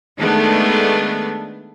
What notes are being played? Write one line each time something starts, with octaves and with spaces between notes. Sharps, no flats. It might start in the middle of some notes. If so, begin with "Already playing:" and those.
D#3 G#3 A3 B3 D4